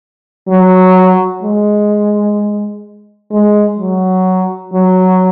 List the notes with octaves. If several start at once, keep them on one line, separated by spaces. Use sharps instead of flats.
F#3
G#3
G#3
F#3
F#3